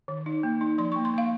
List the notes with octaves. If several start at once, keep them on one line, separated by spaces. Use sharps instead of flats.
D#3
D#4
A#3
D#4
F3 C6
A#3 C#6
C6
A#3 F5